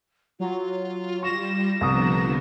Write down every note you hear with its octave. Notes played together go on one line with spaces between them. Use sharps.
F#3 F4
G3 C#6 A#6 E7
C2 D3 F3 B3 A#5 D#6